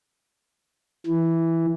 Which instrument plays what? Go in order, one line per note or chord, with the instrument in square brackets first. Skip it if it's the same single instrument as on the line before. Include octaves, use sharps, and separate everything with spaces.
[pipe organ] E3